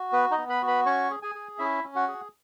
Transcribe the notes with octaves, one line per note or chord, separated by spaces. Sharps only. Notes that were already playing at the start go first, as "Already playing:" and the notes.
Already playing: F#4
B3 B4
D#4 D#5
B3
B4 B5
F#4
B4 B5
C#4 C#5 C#6
G#4
G#4 G#5
G#4
C#4 E4 E5
C#4
F#4 F#5
G#4